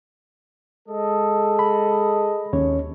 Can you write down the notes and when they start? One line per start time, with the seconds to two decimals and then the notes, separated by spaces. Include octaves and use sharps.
0.89 G#3 A4 D#5
1.59 B5
2.53 D#2 C#4 C#5